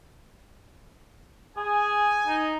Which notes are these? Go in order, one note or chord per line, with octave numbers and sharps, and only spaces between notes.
G#4 G#5
D#4